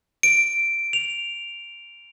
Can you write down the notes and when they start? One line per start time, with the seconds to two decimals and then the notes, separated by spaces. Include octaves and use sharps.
0.23 D7
0.93 F7